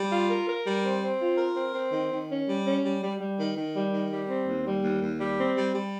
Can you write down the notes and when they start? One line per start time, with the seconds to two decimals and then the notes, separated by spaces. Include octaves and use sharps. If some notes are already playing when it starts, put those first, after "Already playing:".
Already playing: G3
0.12 F4
0.30 A#4
0.47 A#4
0.66 G3
0.84 C4
1.03 C4
1.20 F4
1.38 A#4
1.56 C4
1.74 C4
1.92 D#3
2.12 D#3
2.29 C#4
2.48 G3
2.65 C#4
2.84 G3
3.02 G3
3.20 G3
3.39 D#3
3.57 D#3
3.74 G3
3.93 D#3
4.11 G3
4.29 C4
4.47 D#2
4.66 G3
4.83 D#2
5.02 D#2
5.20 G3
5.38 C4
5.57 G3
5.74 G3